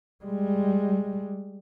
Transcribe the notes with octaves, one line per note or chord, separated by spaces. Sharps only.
G3 G#3